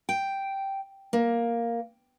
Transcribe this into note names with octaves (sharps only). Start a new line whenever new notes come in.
G5
A#3